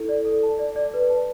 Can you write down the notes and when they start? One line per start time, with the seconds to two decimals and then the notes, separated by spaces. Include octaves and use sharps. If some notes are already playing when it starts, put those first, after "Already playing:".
Already playing: E4 A4
0.09 D5
0.25 A4
0.43 A5
0.59 D5
0.76 D5
0.94 B4
1.10 A5